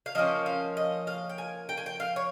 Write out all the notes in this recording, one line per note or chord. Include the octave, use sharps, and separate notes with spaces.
F5
F3 A#3 C#4 D#5
F5
D#5
F5
G5
G#5
G5
G#5
G5
F5
C#5